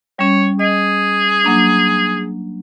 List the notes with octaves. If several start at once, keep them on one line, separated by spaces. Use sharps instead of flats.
G3 C#4 C#5
G#4 D#5
F#3 A#3 D4